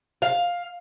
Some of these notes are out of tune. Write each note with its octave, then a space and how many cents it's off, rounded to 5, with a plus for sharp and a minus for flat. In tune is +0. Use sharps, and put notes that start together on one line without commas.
F5 +10